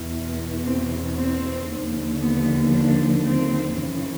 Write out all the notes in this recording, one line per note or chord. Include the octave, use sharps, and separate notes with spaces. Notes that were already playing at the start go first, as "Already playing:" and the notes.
Already playing: E2 B2
C4
C4
D#2 D3 F3
B3
D4
C4
F#2 C#3 E3